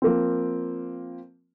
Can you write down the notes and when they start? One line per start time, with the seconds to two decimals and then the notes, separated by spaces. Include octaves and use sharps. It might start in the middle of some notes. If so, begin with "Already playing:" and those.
0.02 F3 A#3 C4